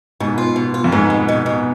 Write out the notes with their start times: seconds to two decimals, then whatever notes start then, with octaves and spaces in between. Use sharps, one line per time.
0.20 G#2 B2
0.38 F4
0.56 B2
0.74 F4
0.84 F2
0.92 G#2 B3
1.10 B2
1.28 B2
1.46 B2